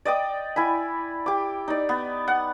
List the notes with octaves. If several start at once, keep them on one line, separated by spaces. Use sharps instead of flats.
D5 D#5 G5 D#6
E4 G#5 B5
G4 D6
D#4 D5
B3
F#5